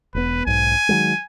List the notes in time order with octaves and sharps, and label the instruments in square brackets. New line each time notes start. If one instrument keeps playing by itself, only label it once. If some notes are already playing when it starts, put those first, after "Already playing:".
[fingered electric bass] E1 B3 [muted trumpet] B4
[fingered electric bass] B1 G#2 [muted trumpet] G#5
[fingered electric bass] D#3 F#3 G#3